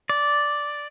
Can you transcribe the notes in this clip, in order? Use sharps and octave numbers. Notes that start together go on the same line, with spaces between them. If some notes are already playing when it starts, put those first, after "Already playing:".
D5